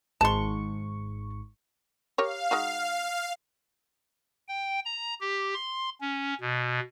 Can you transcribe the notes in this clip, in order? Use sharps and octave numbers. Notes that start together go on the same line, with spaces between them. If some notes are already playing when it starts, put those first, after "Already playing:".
G#1 G#2 A5 C6 C#6
G4 A#4 C#5 F5
G#3 D#4 F#4
G5
A#5
G4
C6
C#4
B2